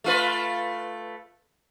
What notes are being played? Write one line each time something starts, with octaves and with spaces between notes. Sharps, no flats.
A3 F4 B4